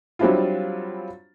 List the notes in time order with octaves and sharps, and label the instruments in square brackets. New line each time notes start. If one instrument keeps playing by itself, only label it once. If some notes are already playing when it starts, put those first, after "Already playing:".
[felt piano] F#3 G3 C4 D4 E4 F4